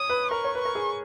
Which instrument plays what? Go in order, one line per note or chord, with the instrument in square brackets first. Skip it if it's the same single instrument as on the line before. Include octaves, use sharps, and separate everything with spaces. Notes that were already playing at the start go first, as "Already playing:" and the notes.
Already playing: [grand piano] C#5 [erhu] D#6
[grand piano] B4
[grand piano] A#4 [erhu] C#6
[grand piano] C#5
B4
[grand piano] A#4 [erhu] C#6
[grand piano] G#4